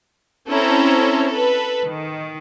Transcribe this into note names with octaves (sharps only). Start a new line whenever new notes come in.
C4 C#4 E4 A4 C5 A#5
A4 B4
D#3